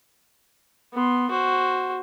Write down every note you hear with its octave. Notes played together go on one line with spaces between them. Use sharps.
B3 C6
F#4 C5